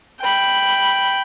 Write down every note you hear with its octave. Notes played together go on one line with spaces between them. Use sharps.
G5 B5